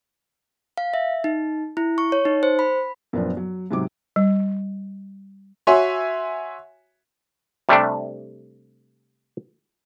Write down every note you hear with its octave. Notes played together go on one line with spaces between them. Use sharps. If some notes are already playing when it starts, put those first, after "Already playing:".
F5
E5
D#4
E4
C#6
C#5
D#4
C5
B5
F#2 A#2 F3 B3 C4 D4
F#3
G#2 C3 F#3 D6
G3
F#4 C#5 E5 G#5 C6
C3 G3 A3 D4